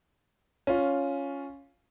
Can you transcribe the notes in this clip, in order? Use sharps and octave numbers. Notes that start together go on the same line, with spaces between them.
C#4 F4